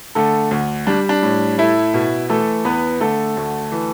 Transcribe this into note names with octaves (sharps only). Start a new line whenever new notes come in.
D3 A3 A4
D2
G3 D4
D4
A2
A3 E4
B2
E3 A3 A4
E2 B3 B4
D3 A3 A4
D2
E3